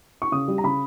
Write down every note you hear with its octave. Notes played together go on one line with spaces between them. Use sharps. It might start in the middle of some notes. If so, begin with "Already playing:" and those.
C#6
C#3 D#6
G3
A#5
C#3 B5